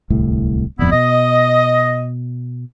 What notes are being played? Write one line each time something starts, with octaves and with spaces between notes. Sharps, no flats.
D1 C2 A2
D1 F2 G3 B3 E4
B2 D#5